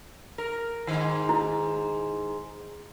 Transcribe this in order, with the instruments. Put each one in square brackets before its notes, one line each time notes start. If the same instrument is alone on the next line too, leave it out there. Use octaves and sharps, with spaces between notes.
[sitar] A#4
G#2 D#3
[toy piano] E4